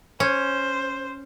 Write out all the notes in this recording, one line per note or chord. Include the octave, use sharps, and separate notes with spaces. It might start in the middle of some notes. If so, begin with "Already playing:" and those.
C#4 C5